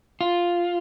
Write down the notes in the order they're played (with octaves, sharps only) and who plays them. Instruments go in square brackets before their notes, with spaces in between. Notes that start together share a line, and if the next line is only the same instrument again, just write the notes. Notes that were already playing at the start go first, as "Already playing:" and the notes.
[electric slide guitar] F4